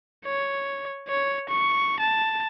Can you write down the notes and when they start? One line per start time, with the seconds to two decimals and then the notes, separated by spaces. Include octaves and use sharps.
0.25 C#5
1.08 C#5
1.49 C#6
1.99 A5